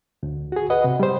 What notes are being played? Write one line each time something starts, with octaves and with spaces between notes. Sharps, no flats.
D2
F#4 G#4
B4 D#5 F#5
C3
G3 C5